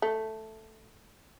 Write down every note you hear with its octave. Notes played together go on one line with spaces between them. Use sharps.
A3